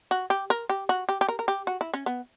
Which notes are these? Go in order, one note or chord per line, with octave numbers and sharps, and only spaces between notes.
F#4
G4
A#4
G4
F#4
G4
G4
A#4
A#4
G4
F#4
E4
C#4
B3